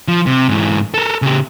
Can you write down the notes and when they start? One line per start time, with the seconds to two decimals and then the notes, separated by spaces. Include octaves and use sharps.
0.08 F3
0.26 C3
0.49 G#2 E3
0.94 A4 A#4
1.22 C#3 G4